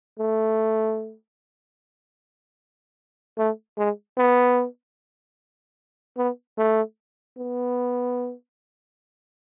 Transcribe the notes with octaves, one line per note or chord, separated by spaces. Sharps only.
A3
A3
G#3
B3
B3
A3
B3